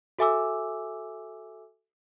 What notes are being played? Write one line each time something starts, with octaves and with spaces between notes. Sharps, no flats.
F#4 A4 E5 G#5 D6 E6